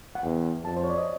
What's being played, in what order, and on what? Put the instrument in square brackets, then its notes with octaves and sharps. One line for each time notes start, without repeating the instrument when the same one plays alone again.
[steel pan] F#5
[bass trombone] E2 [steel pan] G5
[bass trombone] F2 [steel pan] A5
[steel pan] C5
C#5
D5
D#5